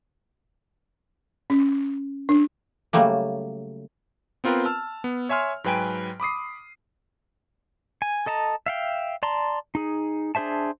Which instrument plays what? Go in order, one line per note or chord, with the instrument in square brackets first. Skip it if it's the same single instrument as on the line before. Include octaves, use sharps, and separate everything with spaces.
[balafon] C#4
D4
[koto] C#3 F#3 G3 A3 A#3
[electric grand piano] B3 C4 F4 A#4 B4 G5
A5 E6 F6
B3
C#5 E5 G#5 C6 F6
G#2 F#3 B4 G5 G#5 D7
B5 D6 D#6 C7
[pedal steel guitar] G#5
A4 D#5 A5 A#5
E5 F5 G5
D5 A5 A#5 C6
D#4 G#4
D4 G#4 C5 E5 A5